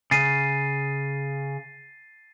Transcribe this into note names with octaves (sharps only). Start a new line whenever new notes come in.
C#3 A6 C7 D#7